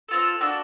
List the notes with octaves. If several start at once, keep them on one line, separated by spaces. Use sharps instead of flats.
C4 F4 A4
A#3 D4 F#4 E6